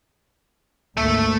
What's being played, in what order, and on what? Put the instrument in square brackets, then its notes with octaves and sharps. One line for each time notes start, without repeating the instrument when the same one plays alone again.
[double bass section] G#1 D2 A#3 [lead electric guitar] A3 E5